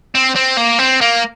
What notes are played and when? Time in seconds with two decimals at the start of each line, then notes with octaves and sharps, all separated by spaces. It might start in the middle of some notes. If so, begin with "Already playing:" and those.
0.15 C4
0.36 C4
0.57 A#3
0.79 C4
1.01 A#3